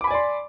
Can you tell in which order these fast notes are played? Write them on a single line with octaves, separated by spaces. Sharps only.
D6 B5 G#5 D5 C6